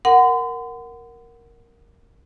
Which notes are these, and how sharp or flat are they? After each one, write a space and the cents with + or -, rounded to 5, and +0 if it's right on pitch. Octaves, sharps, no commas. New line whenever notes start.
A#4 +0 F#5 +0 C6 -45